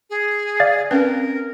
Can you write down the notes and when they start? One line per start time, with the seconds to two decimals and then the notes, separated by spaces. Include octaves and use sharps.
0.10 G#4
0.60 D5 F5 A6
0.91 C4 C#4 A#4 B4